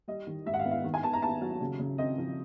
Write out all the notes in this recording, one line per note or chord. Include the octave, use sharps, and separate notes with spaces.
G3 D#5
D#3
G#2 E5
F#5
F5
B3
F5
D#3
G#5
B3 A5
A#5
B3 A5
F#3
C#3
C#3
C4 D#5
F3